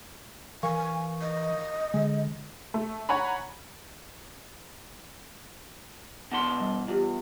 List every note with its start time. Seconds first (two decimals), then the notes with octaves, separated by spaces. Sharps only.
0.63 E3 A#4 F5 G#5 C#6
1.21 D#5
1.94 D3 G#3
2.74 A3
3.09 C#5 F#5 G#5 A#5 B5
6.32 B2 E3 F#5 A5 C6
6.60 G3
6.88 E2 F4 G4